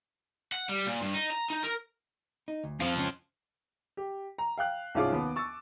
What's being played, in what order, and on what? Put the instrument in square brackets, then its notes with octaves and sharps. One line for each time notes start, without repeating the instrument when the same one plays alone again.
[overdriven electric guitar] F#5
G3
A#2
G2
D#4
A#5
D#4
A#4
[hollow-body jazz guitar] D#4
D2
[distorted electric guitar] F2 F3 [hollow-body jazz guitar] C4 C5 F5
[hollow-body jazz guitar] C#2 C#4
[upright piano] G4
A#5
F5 G5 F#6
C2 G#2 C#4 F4 G#4 D6
D#2 B3
C#6 E6 A6